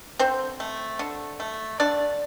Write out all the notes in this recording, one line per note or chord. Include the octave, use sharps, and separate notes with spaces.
D3 C4 C5
A3
D3
A3
D3 D4 D5